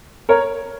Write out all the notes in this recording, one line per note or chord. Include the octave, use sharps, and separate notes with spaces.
A#4 C#5